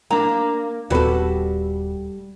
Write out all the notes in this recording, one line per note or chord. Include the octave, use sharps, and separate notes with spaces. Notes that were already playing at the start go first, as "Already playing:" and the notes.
A#3 D4 A#5
D#1 G3 B3 C4 F#4 A4 B4